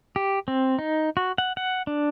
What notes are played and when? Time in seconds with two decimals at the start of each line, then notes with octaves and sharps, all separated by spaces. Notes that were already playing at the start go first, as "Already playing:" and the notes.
0.16 G4
0.48 C4
0.79 D#4
1.17 F#4
1.38 F#5
1.57 F#5
1.87 D4